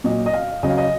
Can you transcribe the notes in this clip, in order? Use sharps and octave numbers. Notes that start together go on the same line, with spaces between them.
A#2 F#3 D#5
D#5
F5
C#3 F#3 D#5
F5
D#5